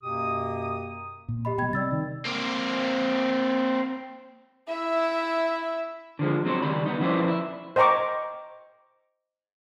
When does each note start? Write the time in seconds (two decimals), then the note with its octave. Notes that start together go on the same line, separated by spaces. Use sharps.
0.03 F#2 B2 A#3 G4 D#6
1.28 A#2
1.45 G4 D#5 B5
1.58 B2 G3 G5 B5 G#6
1.73 C3 D5 E6 A6
1.91 D#3
2.25 A#3 C4
4.68 E4 E5
6.19 D3 F3 G#3
6.45 F#3 C4 F#4 C5 C#5
6.62 C#2 D#3 G3 B5
6.86 B3 D#4
7.00 F3 C#4 E4 B4 C5 D5
7.28 E4
7.76 C5 D#5 G5 A#5 C#6 D6